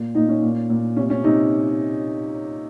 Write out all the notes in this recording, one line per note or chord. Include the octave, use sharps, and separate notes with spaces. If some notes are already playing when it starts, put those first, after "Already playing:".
Already playing: A#2
A#2 D#4
C#4
A#2
A#2
C3 C#4
C#4
C3 D#4